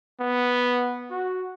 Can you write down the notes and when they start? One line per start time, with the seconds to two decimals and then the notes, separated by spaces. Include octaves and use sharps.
0.20 B3
1.11 F#4